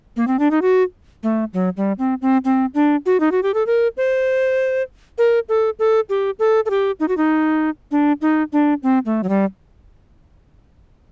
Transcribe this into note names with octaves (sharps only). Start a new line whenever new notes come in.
A#3
C4
D4
D#4
F#4
A3
F#3
G3
C4
C4
C4
D4
F#4
D#4
F#4
G4
A4
A#4
C5
A#4
A4
A4
G4
A4
A4
G4
D#4
F#4
D#4
D4
D#4
D4
C4
A3
F#3
G3